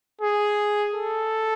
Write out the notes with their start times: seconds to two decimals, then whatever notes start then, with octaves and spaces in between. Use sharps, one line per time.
0.21 G#4
0.94 A4